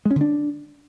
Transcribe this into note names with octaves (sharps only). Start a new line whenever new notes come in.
G#3
C#4
D3
D4